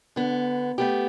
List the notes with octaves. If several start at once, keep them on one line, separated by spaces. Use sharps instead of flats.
D3 B3
A3 B3 G4